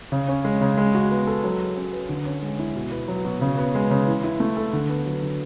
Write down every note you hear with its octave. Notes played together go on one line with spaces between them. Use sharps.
C#3
C#4
G#3
C#3
G#3
F#4
B3
A4
F#3
G#4
C#4
B4
D3
C#4
G#3
E4
B2
B3
F#3
B2
C#3
B3
G#3
C#3
E3
E4
A3
A4
D3
B3
F#3
D3